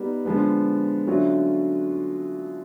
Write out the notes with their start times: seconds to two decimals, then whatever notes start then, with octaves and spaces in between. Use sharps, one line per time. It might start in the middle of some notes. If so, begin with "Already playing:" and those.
Already playing: G3 B3 D#4
0.25 D3 F3 G#3 B3
1.07 D3 F#3 A3 C#4 F4